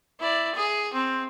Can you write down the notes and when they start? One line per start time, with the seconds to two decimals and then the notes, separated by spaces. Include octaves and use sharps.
0.20 E4 D5
0.55 G#4
0.93 C4